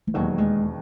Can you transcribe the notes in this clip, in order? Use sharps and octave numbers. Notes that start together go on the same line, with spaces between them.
E3
E1 D#2 D#3 F#3
G#3